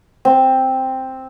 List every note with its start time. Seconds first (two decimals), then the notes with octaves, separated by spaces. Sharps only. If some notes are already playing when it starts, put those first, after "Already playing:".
0.25 C4